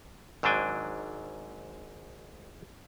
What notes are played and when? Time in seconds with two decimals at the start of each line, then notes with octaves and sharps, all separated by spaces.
0.43 G#1 G#2 F#3 D4 G5 G#5